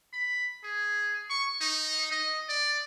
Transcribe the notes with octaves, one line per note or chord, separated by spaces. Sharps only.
B5
G#4
C#6
D#4
D#5
D5